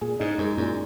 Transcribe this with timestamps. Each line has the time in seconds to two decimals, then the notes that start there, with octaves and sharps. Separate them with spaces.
0.01 A#2 G#4
0.19 G#2 D#4
0.38 F#2 G#3
0.57 F#2 A#2